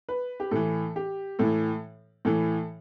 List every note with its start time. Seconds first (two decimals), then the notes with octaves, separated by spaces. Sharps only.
0.09 B4
0.40 G4
0.51 A2 E3 A4
0.96 G4
1.39 A2 E3 A4
2.25 A2 E3 A4